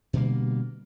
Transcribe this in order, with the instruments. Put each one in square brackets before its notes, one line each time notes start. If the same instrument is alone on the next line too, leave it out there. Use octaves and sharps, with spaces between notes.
[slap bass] B2 D3 G3 A#3